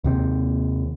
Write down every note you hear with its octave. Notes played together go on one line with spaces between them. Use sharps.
D#2 C3 C4